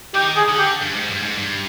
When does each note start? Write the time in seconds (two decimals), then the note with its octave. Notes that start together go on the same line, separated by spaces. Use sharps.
0.15 D#3 G4
0.37 G#4
0.48 D3
0.59 G4
0.82 G2
0.95 G#2
1.09 G2
1.22 G#2
1.37 G2